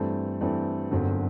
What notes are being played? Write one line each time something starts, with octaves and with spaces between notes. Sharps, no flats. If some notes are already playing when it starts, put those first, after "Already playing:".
Already playing: G2 E3 A3 C4
G2 E3 A3 C4
G1 F#2 D3 F#3 C4